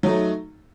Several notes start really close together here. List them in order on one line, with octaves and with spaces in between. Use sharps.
F#3 D#4 A3